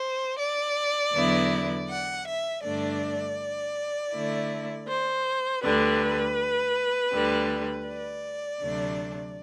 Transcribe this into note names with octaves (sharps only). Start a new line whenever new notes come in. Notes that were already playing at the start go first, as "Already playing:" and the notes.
Already playing: C5
D5
E2 D3 F#3 B3 E4
F#5
E5
G2 D3 A3 D4 D5
D3 A3 E4
C5
D2 D3 G3 B4
D2 D3 G3
D5
D2 C3 F#3 A3 D4